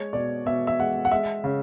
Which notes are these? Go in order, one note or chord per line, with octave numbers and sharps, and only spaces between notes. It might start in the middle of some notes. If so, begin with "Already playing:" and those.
Already playing: G#3 C#5
B2 D5
B2 E5
E5
G#3 F#5
F#5
G#3 E5
C#3